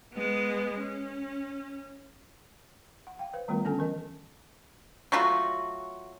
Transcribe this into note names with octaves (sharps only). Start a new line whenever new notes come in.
G#3 B3
C#4
F#5
F5 G5
B4 C5 F5
D#3 G3 A3 B3 F4 A#4
D3 C#4 D4 A4 G#5 A5
E3 A#4 D#5
F#3 A3 F4 F#4